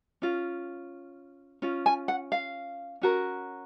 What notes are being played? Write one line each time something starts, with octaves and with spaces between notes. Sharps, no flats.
C#4 F4
C#4 F4
G#5
F#5
F5
C#4 F#4 A#4